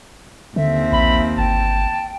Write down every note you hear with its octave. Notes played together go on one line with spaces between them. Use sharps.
D#2 D3 C4 E5
A#1 B5
G1 G5 A5